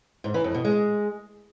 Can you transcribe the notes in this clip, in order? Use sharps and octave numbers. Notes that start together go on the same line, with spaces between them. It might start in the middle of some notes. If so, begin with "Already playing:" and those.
G#2
E3
F2
B2
G#3